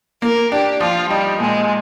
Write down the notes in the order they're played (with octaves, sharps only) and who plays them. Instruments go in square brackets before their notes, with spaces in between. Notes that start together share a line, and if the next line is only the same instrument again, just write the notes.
[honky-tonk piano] A#3 [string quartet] A#4
[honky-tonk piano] D4 [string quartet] G4
[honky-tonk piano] F3 [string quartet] F4
[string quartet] G3 [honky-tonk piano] D#4
[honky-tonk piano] A#2 [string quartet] G#3